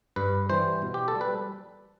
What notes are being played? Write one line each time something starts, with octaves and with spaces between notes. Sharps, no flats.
G2 B4
E3 G3 C5
B2
G4
A4
G3
B4